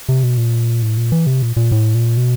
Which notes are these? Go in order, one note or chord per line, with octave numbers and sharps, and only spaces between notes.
C3
B2
A#2
A2
A#2
E3
C3
A#2
A#2
A2
A#2
B2